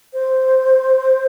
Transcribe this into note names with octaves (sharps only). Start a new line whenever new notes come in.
C5